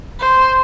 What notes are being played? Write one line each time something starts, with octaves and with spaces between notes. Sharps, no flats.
C5